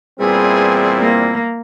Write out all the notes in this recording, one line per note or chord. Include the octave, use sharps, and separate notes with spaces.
E2 A#2 E3 G3 C4 E4 G#4
A#3